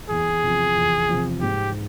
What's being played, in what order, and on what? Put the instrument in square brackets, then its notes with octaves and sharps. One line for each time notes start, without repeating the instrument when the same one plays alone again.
[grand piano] E2 [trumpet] G#4
[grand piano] C3 F3
E2
C3 F3
[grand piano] G#2 [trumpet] G4